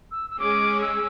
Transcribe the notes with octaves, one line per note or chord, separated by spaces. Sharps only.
E6
E6
G#3 C#4 G#4 D6
E6